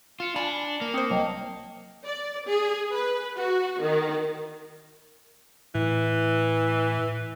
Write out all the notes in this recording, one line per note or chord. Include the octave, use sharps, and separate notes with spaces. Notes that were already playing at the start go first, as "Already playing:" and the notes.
F4 C#7 E7
D4 G#5 A5 B5
A#3
C4 C5 D#6 C#7
C2 F#3 D#5 G5 A5
D5
G#4
B4
F#4
D#3
A2 E3